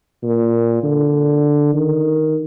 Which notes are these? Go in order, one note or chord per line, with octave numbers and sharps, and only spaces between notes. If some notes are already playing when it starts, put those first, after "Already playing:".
A#2
D3
D#3